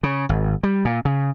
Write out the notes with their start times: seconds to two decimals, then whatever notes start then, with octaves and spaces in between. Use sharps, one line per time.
0.03 C#3
0.29 G#1
0.63 G3
0.85 A#2
1.05 C#3